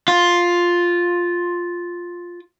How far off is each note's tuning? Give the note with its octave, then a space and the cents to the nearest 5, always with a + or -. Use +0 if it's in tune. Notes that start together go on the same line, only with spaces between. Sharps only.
F4 +5